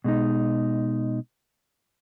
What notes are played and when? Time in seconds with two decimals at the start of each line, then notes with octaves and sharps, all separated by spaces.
0.04 B2 G#3 D#4